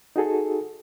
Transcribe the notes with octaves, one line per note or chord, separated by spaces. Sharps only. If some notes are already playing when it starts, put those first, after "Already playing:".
D#4 F#4 G#4 A4